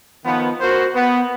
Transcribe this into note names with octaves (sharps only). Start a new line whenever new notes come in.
D#3 F3 B3
F#4 A#4 C5
B3